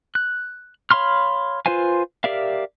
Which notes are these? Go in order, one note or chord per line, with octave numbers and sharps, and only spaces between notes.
F#6
C#5 F5 B5 C6 F6
F4 B4 C5 F5 G#5
G4 A#4 D5 E5 F5